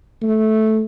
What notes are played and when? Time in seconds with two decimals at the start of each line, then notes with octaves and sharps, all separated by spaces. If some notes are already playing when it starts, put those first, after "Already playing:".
0.22 A3